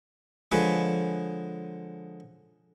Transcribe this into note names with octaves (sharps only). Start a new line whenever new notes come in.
D3 F3 G#3 B4 C#5 G#5